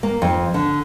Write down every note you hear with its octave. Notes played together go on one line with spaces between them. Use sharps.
A#3
F2
D3